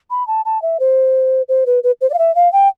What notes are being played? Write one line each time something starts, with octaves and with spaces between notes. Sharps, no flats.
B5
A5
A5
E5
C5
C5
B4
B4
C5
D5
F5
E5
F5
G5